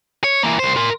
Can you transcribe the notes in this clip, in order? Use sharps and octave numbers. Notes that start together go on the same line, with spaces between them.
C#5
E3 A#3
C2 C5
A#4 C6